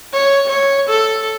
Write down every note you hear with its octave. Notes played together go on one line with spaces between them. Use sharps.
C#5
C#5
A4